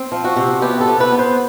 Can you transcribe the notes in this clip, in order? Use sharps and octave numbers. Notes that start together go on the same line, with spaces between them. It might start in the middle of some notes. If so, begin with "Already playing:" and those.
Already playing: C4
F3
F#4
C3
B3 G4
A4
B3
B4
B3
C5